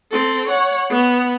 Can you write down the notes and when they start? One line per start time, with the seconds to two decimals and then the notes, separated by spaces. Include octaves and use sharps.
0.11 C4 A4
0.48 C#5 F#5
0.90 B3